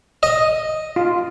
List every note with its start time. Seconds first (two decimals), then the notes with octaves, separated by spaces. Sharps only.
0.23 D#5
0.96 F4